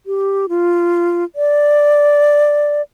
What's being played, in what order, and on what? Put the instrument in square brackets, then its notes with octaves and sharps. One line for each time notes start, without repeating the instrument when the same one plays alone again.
[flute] G4
F4
D5